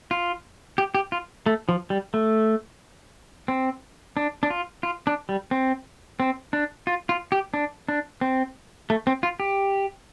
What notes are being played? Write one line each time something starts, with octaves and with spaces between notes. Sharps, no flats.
F4
G4
G4
F4
A3
F3
G3
A3
C4
D4
D4
F4
F4
D4
G3
C4
C4
D4
F4
F4
G4
D4
D4
C4
A3
C4
F4
G4